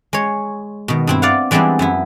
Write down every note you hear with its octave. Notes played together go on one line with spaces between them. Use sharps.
G#3 C#5
B2 D#3
G2 C4 E4
D5 F5 F#5
E3 G3 G#3 B3 C4 D4
F#2 B3 E4